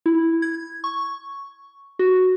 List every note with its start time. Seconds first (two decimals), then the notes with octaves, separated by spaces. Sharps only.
0.06 E4
0.42 G#6
0.84 C#6
1.99 F#4